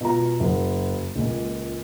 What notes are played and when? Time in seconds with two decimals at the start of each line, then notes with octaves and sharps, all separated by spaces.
0.01 B2 F4 A#5
0.40 F#1 F#3
1.15 C#2 A#2